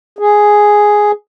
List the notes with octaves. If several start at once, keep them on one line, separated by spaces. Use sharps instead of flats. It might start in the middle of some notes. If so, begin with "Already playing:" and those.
G#4